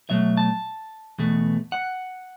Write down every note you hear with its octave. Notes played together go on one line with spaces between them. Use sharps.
B2 F#3 A3 E5
A5
E2 B2 A3
F#5